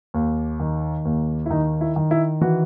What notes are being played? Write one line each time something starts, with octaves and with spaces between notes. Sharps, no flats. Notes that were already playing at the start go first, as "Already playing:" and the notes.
D#2
D#3
D#2
E4
D#3 D#4
E4
D#3
E4
E3 F#4